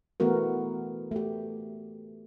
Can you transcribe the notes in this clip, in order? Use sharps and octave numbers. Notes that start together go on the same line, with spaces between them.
E3 A3 B3 F#4 A#4
A3 G4